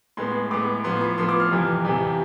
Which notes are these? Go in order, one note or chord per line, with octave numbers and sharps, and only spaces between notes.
A2 G#3 B3 C6
A2 G#3 B3 D6
A2 F3 B3 C6
B5
A2 F3 B3 C6
D6
F6
F2 C3 E3
F2 C3 E3